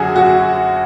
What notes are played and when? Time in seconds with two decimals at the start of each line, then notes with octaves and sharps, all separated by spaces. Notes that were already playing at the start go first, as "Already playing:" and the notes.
Already playing: F#2 D3 F#3 F#4 G#4
0.16 F#4